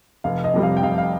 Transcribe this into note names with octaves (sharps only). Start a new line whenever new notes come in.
F1 F5
D#5
F2 C3 G3
F5
G5
F1 F5
F5